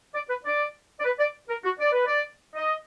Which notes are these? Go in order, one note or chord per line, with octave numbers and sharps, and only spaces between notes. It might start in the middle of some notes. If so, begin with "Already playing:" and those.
D5
B4
D5
D5
B4
D5
A#4
F#4
D5
B4
D5
D#5